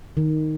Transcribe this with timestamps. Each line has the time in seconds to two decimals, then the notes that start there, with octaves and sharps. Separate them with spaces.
0.17 D#3